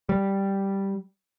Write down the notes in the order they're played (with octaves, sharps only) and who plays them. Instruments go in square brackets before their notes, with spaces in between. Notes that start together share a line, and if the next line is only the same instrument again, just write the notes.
[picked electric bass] G3